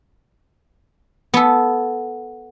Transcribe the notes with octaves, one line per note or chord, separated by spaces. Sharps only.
B3 A4